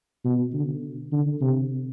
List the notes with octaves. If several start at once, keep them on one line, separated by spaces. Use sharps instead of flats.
B2
D3
D3
C3